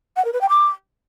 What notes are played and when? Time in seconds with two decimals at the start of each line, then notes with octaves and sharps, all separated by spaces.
0.17 F#5
0.25 A#4
0.33 B4
0.41 G5
0.49 D6